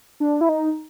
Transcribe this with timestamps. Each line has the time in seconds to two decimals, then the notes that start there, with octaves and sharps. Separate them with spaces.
0.20 D4
0.41 E4
0.49 D#4